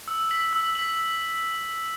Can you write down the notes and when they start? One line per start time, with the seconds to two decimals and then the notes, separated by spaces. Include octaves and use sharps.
0.08 E6
0.31 B6 F#7
0.53 E6
0.75 B6 F#7